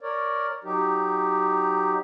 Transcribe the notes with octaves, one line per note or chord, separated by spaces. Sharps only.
A#4 C#5 D5
F#3 D#4 G4